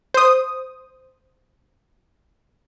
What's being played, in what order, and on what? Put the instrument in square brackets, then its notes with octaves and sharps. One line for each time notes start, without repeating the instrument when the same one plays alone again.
[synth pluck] C5 D#6